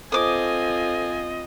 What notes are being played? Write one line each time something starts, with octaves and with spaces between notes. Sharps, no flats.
C4 F4 A4 C5 D#5 G#5 D6 D#6